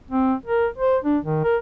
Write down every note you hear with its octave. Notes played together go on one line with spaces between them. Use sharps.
C4
A#4
C5
D4
D#3
A#4